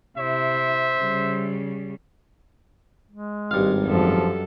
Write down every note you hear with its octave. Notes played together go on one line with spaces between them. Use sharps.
C3 E4 C5 E5
C#3 G3
G#3
G#1 G2 F5
F#2 F3 A4